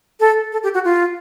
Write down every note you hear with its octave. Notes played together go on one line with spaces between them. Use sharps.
A4
A4
G4
F#4
F4